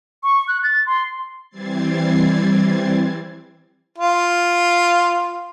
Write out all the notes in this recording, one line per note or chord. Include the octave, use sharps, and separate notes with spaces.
C#6
F#6
A6
C6
E3 G3 C4 G#6 A6 C7
F4